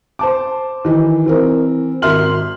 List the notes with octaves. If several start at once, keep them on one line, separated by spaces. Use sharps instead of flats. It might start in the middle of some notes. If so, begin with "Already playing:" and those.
C5 A5 D6
D#3 E3
E3 C4 A#4
G#1 A#4 E5 C6 F6 F#7